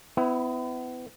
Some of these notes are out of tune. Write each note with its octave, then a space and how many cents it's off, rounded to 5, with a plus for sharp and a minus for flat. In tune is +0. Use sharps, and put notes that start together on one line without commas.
B3 +35 E4 +0